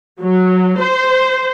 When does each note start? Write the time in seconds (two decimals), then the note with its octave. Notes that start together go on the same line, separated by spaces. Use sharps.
0.20 F#3
0.79 C5